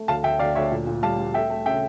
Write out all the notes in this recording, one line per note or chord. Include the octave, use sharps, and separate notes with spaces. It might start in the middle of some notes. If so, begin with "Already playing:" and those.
Already playing: A3
D2 F5 A5
D2 E5 G5
D2 D5 F5
D2 C#5 E5
A#2
A#2
G3 F5 A5
G3
A3 E5 G5
A3
C#3 E5 G5